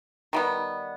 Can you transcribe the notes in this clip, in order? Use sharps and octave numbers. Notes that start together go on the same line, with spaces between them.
D#3 G3 B3